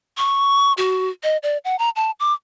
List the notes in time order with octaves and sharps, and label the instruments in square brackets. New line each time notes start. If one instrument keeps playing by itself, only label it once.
[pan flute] C#6
F#4
D#5
D5
F#5
A#5
A5
D6